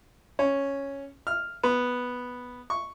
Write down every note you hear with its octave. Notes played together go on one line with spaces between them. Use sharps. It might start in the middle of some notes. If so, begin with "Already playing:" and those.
C#4
F6
B3
C#6